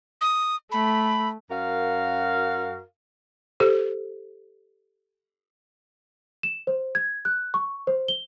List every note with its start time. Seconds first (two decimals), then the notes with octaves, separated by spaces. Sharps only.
0.21 D#6
0.72 A3 B5
1.51 F#2 F#4 A#4 F5
3.60 G4 A4 C5
6.43 E7
6.67 C5
6.95 G#6
7.25 F#6
7.54 C#6
7.87 C5
8.08 G7